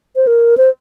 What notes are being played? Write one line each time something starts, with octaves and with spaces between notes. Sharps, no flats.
C5
A#4
C5